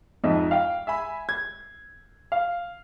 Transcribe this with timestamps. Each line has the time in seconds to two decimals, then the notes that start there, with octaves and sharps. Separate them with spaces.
0.24 F2 G#2 D#5 E5
0.51 F5 G5
0.87 E5 G#5 B5
1.29 G#6
2.32 F5